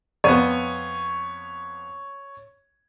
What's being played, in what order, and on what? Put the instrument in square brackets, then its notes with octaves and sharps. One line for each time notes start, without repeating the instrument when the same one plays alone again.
[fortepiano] F2 B3 [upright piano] C#5 D#7